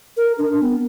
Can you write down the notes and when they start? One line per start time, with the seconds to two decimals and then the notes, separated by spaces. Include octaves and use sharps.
0.17 A#4
0.38 D4
0.61 B3